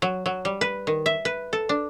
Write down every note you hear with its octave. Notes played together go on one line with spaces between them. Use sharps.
F#3
F#3
G3
B4
D#3
E5
B4
A4
D4